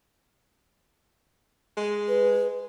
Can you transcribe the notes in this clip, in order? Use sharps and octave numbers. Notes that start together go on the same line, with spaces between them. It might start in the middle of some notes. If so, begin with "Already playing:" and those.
G#3
B4